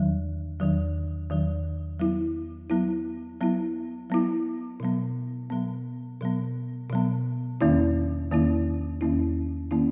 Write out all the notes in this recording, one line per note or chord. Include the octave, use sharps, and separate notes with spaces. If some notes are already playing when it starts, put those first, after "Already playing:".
Already playing: E2 D#3 F#3
E2 D#3 F#3
E2 D#3 F#3
F#3 B3 E4
F#3 B3 E4
F#3 B3 E4
F#3 B3 E4
B2 F#3 B3
B2 F#3 B3
B2 F#3 B3
B2 F#3 B3
E2 D#3 A#3 C#4 E4
E2 D#3 A#3 C#4 E4
E2 D#3 A#3 C#4 E4
D#3 A#3 C#4 E4